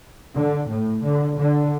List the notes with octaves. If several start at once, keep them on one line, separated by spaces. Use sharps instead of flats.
D3
A2
D3
D3